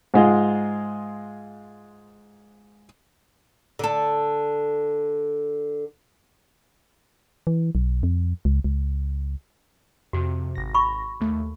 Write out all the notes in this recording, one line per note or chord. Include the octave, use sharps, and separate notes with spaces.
G#2 G#3 F4
D3 A4
E3
B1
F2
C#2
C#2
F2 C3 F#4
G#1 A#6
B5 C#6
D#2 A3